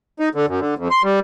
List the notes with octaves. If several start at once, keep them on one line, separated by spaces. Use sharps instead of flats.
D#4
D3
F#2
D3
F2
C6
G3